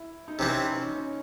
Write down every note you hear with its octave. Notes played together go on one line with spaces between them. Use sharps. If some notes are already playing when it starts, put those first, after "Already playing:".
Already playing: E4
D#4
C3 E3 C4 C#4
C#4
D#4
C#4